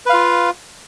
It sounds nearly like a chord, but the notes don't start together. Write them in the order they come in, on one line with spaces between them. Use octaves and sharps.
B4 F5 F4